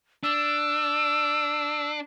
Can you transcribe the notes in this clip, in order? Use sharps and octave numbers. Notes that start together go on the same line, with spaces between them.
D4 E6